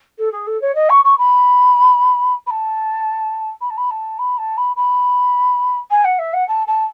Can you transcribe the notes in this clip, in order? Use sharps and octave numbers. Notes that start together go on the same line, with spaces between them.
A4
G#4
A4
C#5
D#5
C#6
C#6
B5
B5
A5
B5
A5
B5
A5
B5
A5
B5
B5
G#5
F#5
E5
F#5
A5
A5